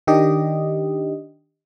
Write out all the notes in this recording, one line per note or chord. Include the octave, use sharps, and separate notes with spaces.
D#3 D4 G4 D#5